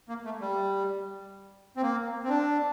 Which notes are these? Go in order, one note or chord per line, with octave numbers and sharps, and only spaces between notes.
A#3
A3
G3
C4
A#3
C4
D4